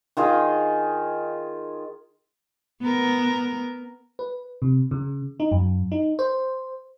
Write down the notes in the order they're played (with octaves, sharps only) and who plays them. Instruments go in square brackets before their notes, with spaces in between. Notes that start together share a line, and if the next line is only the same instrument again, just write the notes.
[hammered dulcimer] D#3 F4 G#4 D#5
[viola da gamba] B3 A#4
[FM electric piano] B4
C3
C#3
D#4
F#2
D#4
C5